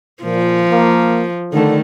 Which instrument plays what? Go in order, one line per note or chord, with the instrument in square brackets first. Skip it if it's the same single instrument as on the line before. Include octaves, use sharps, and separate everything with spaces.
[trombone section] A#2 [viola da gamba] F3
[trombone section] A#3
[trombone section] D3 [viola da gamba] D#3 A3